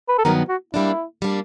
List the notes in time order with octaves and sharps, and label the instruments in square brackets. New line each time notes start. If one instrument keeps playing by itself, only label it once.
[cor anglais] B4
A4
[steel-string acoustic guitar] G2 D#3 F#3 B3 [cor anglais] A#4
[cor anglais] F#4
[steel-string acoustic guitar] G3 A#3 D4 [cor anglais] E4
[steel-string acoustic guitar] G3 A#3 D4